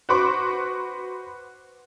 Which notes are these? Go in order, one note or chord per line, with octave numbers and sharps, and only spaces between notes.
F#4 B4 C5 B5 C#6 D6